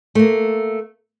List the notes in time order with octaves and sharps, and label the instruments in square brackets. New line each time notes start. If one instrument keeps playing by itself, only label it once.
[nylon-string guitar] A3 A#3